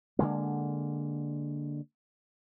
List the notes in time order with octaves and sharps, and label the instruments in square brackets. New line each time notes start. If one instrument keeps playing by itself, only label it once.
[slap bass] D3 E3 G#3 A#3